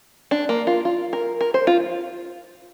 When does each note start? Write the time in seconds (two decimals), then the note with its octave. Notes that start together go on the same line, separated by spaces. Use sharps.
0.31 D4
0.49 A#3
0.67 F4
0.85 F4
1.13 A#4
1.41 A#4
1.54 C5
1.67 F4